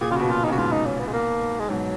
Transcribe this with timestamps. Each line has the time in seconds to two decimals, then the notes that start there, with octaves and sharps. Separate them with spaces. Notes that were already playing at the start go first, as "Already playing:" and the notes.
0.01 A#2 G#4
0.11 C#3 F4
0.16 B2 F#4
0.29 A#2 F4
0.44 C#3 D#4
0.52 F#4
0.58 G#2 B2 F4
0.72 D#4
0.86 C#4
1.00 B3
1.07 G#3
1.13 A#3
1.60 G#3
1.70 G#2 B2 F#3